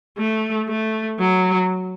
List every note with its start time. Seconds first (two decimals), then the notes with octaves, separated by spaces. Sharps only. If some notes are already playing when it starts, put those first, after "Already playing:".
0.18 A3
0.68 A3
1.19 F#3